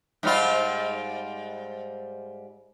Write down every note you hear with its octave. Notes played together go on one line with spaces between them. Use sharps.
G#2 G3 F4